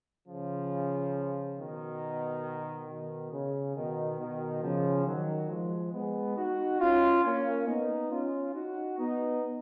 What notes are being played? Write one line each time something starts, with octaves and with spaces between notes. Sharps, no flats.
C#3 F3
B2 D#3
B2 D#3
C#3
B2 D#3
B2 D#3
C#3 F3
D#3 F#3
F3 G#3
G#3 B3
D#4 F#4
C#4 F4
A#3 C#4
B3 D#4
C#4 F4
D#4 F#4
B3 D#4